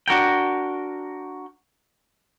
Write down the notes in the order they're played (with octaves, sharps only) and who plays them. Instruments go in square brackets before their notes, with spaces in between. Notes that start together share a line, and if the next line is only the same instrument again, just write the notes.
[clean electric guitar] D4 F#4 A#4 G5